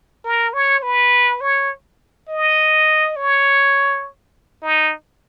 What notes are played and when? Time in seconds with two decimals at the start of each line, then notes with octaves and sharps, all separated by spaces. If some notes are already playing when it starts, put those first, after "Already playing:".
0.25 A#4
0.54 C#5
0.83 B4
1.41 C#5
2.29 D#5
3.16 C#5
4.62 D#4